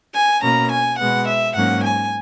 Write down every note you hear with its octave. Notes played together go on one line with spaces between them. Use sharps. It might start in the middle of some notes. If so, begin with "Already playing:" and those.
G#5
B2 A#3 C#4 A#5
G#5
B2 G#3 B3 F#5
E5
G#2 F#3 A#3 C#4 F#5
G#5